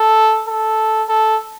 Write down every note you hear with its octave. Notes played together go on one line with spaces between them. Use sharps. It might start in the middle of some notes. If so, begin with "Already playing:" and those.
Already playing: A4
A4
A4